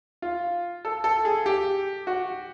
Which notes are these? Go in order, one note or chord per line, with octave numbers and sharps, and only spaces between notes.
F4
A4
A4
G#4
G4
F#4